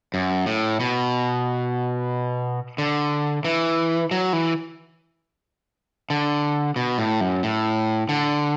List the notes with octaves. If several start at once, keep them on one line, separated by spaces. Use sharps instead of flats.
F#2
A2
B2
D3
E3
F#3
E3
D3
B2
A2
F#2
A2
D3